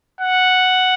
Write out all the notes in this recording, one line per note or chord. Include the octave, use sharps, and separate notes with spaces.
F#5